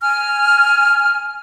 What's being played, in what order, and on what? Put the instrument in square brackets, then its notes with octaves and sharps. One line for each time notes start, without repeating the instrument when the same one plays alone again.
[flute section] G#5 F6